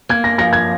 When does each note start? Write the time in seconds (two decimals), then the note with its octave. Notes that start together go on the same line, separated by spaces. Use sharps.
0.09 A#3 G#6
0.24 A#6
0.38 F3 A#6
0.53 G#6